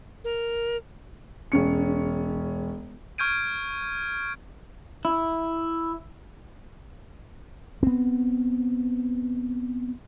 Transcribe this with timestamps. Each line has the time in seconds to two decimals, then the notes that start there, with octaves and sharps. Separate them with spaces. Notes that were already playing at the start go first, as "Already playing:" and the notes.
0.24 A#4
1.52 E1 C#4 C#7
3.18 C#6 F6 G6 G#6 D7 D#7
5.05 E4
7.83 B3 C4